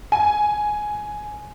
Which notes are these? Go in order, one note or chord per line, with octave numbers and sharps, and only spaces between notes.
G#5